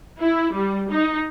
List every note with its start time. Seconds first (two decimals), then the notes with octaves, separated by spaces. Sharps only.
0.20 E4
0.54 G3
0.90 D#4